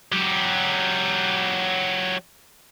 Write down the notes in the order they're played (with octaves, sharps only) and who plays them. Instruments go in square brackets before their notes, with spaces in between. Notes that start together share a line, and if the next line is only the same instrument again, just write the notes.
[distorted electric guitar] F#3 G4